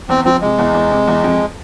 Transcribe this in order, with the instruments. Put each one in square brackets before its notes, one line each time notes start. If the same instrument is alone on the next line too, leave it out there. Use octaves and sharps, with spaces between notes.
[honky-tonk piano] E2 [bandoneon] C4
[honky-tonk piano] F3 [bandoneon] C4
[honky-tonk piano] C3 [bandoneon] G#3
[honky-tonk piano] E2
E2
C3
E2
F2